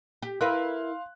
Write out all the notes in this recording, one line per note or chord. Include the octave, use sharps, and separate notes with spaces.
G4
E4 A#4 B4 F5 C6 F#6